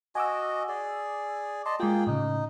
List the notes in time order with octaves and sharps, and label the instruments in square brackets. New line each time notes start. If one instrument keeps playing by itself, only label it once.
[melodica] F#4 D#5 [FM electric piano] G#5 D6 E6
[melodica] G#4 D5
[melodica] D5 D#5 A5 [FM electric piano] C6
[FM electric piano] G#3 F4 [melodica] A#3 G#4 G5
[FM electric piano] A2 C#3 [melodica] D#4